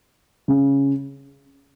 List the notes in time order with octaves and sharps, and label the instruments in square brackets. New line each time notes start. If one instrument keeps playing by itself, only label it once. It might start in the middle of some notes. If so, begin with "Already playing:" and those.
[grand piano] C#3